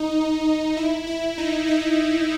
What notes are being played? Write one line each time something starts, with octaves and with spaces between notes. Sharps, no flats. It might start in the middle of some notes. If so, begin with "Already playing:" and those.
Already playing: D#4
E4
E4
D#4
D#4